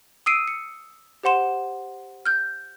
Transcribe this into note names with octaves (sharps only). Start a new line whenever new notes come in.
D#6 E6 C7 D7 D#7
C#7
G4 C5 F#5 C6 E7
F6 G6